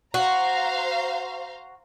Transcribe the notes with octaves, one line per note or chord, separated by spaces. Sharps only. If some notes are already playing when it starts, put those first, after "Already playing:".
F#4 C5 F5 A#5